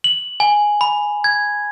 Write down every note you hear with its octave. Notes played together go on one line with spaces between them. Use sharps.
F#7
G#5
B5
G#6